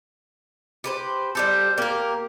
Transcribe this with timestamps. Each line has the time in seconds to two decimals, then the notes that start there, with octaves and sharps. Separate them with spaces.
0.84 G4 B4 C5
1.35 G3 G4 A4 C5
1.78 A#3 G4 A#4